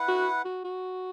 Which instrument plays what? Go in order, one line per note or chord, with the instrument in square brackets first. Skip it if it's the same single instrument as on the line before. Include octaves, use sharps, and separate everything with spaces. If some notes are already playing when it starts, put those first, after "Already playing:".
Already playing: [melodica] E4 B4 F#5
[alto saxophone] F#4
F#4
F#4